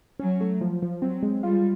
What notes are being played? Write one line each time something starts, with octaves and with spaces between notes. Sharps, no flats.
F#3 C#4
A3
F3
F3
F#3 C4
G#3
G3 F4